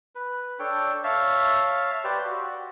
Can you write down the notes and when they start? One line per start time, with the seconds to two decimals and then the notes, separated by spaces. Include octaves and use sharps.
0.15 B4
0.59 D4 A4 C#5 G5
1.04 C#5 E5 F5 A5
2.04 G4 B4 C5 D5
2.26 F#4